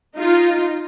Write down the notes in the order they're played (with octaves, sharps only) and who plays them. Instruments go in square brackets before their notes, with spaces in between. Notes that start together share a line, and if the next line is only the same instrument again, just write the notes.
[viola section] D#4 F4